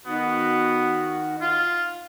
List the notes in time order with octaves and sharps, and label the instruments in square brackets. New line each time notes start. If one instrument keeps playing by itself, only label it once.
[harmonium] D#3 F#4 [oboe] B3
[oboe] F4